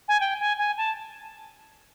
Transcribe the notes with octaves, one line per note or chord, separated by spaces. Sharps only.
G#5
G5
G#5
G#5
A5